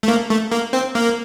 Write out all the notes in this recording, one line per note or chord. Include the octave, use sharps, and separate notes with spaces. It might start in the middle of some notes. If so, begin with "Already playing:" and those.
A3
A#3
A3
A#3
C4
A#3